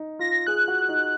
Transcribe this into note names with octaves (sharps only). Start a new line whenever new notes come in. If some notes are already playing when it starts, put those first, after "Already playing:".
Already playing: D#4
F4 A#6
G#4 F#6
F#4
D#4